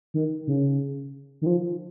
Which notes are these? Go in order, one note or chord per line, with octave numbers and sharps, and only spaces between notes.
D#3
C#3
D#3
F3